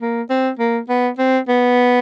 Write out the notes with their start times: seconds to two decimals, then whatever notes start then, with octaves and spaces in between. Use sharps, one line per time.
0.02 A#3
0.30 C4
0.59 A#3
0.89 B3
1.18 C4
1.48 B3